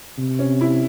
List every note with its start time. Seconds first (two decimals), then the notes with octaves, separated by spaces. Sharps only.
0.18 C3
0.39 C#4
0.61 E4